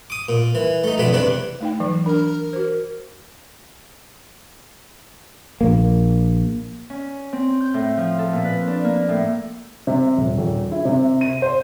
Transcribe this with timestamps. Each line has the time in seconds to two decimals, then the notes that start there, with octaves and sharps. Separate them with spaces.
0.10 D6 D#6
0.29 A#2
0.55 E3
0.84 A3 D#4
0.98 B1 F2 B3 D4 B5
1.13 E2 C3 D4 B4
1.61 A3 D#4 G5
1.80 E3 F#3
2.06 D4 A#4
2.53 F#4 C5
5.61 A#1 A#3
6.90 C#4
7.33 C4
7.61 G6
7.74 A2
7.97 F3
8.19 A4
8.33 A#2
8.44 B4
8.67 D4
8.84 A#3
9.09 A2
9.87 C3
10.17 D#1
10.38 D#1
10.72 E4
10.85 C3
11.21 D#7
11.42 C5